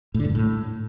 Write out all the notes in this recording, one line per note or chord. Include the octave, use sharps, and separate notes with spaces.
A2
D3
G#2
G2
A2